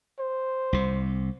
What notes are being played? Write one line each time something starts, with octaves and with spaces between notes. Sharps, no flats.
C5
C2 C3